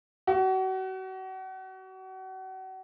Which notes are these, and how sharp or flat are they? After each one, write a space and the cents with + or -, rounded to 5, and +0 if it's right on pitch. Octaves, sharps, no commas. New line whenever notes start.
F#4 +35